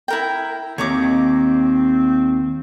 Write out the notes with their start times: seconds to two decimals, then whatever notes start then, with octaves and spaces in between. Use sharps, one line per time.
0.08 E4 A#4 G5
0.78 D#2 C4 C#5 A#5 D6